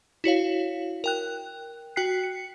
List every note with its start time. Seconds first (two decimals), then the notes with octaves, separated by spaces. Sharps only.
0.24 E4 F#4 C#5 F5
1.04 A#4 G5 F#6
1.96 F#4 G5 F#6 B6 C7
2.23 C#7